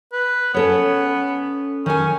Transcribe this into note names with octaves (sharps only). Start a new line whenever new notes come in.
B4
B3 C#4 A4 C#5
D#3 C#4 G#5